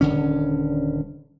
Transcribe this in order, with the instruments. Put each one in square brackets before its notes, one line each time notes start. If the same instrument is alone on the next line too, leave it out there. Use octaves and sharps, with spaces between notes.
[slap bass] D#1 D#2 D3 C#4